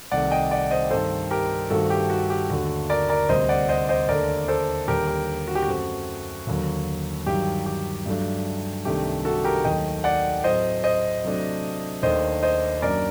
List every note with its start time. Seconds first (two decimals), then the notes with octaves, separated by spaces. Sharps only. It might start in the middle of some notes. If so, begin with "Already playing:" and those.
0.11 C2 C3 D#3 A3 D5 F#5
0.31 D#5 G5
0.51 D5 F#5
0.71 C5 D#5
0.90 G2 D#3 A3 C4 A4 C5
1.31 G4 A#4
1.70 G2 D#3 A3 C4 F#4 A4
1.90 G4
2.10 F#4
2.30 G4
2.50 D#2 D3 A3 F#4
2.90 A#4 D5
3.09 A#4 D5
3.29 D2 C3 G3 C4 C5 D#5
3.49 D5 F#5
3.69 C5 D#5
3.89 C5 D#5
4.08 D#2 D3 A3 A#4 D5
4.48 A4 C5
4.88 D#2 D3 G3 G4 A#4
5.08 G4
5.48 F#4
5.55 G4
5.63 F#4
5.68 F#2 F#3 A3 C4
6.47 D#2 D3 F#3 A#3
7.26 G2 D#3 F#3 G4
7.66 G4
8.06 G2 F#3 A3 D4
8.85 C2 C3 D#3 A3 D4 G4
9.25 F#4 A4
9.44 G4 A#4
9.64 D#2 D#3 F#3 A3 D#5 G5
10.04 D5 F#5
10.44 A2 F#3 A3 C4 C5 D#5
10.84 C5 D#5
11.24 C3 F#3 A3 D4
12.03 D#2 D#3 A3 D4 C5 D#5
12.43 C5 D#5
12.82 F#2 F#3 A#3 D4 A#4 D5